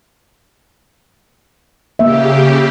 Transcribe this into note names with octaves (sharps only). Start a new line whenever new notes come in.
C#3 A#3 G4 E5